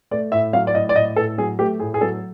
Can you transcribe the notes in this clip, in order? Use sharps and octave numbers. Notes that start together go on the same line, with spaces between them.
A3 D5
A2 E5
F#3 F5
D5
A2 D#5
D5
A2 D#5
A2 A4
F#3 G#4
A3 G4
A2 G#4
G#4
F#3 A4